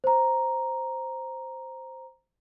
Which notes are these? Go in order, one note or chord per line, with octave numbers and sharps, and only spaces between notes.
C5 A#5